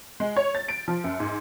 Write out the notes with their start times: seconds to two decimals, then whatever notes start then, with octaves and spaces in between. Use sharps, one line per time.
0.20 G#3
0.36 C#5
0.55 A6
0.68 D7
0.88 F3
1.04 F#2
1.20 G#2